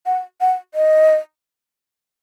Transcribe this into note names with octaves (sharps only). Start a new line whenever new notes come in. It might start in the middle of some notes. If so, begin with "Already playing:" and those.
F#5
F#5
D#5